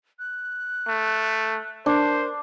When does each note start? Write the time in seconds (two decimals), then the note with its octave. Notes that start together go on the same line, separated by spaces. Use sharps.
0.19 F#6
0.88 A3
1.86 D4 A#4 C5